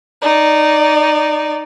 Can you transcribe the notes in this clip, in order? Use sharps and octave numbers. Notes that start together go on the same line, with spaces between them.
D#4 D5